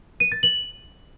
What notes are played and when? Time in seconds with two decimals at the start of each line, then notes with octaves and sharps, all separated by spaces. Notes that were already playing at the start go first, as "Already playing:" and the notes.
0.20 D#7
0.32 A6
0.43 F#7